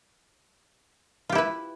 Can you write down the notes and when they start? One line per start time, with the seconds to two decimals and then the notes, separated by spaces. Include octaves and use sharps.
1.29 F4
1.32 G4
1.35 E4
1.38 B4